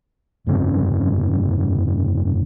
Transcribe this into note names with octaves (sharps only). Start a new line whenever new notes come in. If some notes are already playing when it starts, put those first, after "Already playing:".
F1 G2 C#3 C4